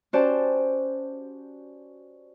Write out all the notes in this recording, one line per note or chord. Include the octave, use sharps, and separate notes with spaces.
C#4 F#4 G4 C5 D5 A5